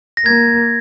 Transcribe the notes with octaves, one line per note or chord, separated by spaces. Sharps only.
A#6
A#3 G#6